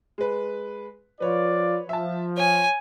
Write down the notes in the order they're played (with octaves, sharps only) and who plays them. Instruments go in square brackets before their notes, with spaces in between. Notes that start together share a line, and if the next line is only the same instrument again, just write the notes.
[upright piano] G#3 B4
[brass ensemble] F3 F4 D5 [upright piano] B4 C#5
[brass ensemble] F3 [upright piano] E5 A5
[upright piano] C#5 [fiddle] G#5